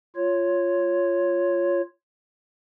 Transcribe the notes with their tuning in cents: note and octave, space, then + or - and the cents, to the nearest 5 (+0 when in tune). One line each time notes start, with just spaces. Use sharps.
F4 +0 C#5 +0